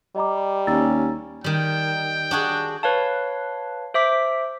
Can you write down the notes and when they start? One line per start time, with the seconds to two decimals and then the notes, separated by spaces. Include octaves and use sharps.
0.16 G3 D#5 A#5 D6
0.67 D#2 C#4 A#5 E6 A6
1.44 D#3 G3 G5
2.31 D4 F#4 G#4
2.83 B4 C#5 F5 A5
3.94 C5 E5 D6 B6